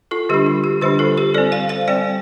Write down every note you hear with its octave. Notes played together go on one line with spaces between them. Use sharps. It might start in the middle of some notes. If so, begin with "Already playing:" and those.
F4 A4
D3 G3 D4 G4
F4
G4
D3 G3 D4 G4 C5
F4 A4
G4 C5
G3 C4 A4 D5
C5 F5
C5 F5
G3 C4 D5 G5